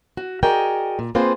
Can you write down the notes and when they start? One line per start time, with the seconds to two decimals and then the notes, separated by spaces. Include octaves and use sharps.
0.17 F#4
0.43 F#4 G#4 A#4 D5 D#5 G5
0.99 A#2
1.15 A#3 C4 F4 G#4 B4 C5